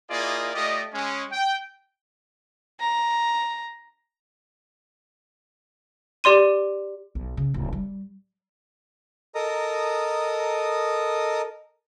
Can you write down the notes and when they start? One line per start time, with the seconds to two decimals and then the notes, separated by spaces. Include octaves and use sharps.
0.10 A#3 E4 F4 G#4 D5 D#5
0.54 A3 F4 G4 D5 D#5
0.93 G#3 C#4
1.32 G5
2.80 A#5
6.24 G4 D5 C6 D#7
7.15 B1
7.37 C#3
7.54 D1
7.73 G3
9.35 A4 A#4 D#5 A#5 D#6